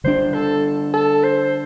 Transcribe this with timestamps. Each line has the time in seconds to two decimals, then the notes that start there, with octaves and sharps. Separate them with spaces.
0.04 D3 G3 D4 C5
0.34 A4
0.94 A4
1.24 C5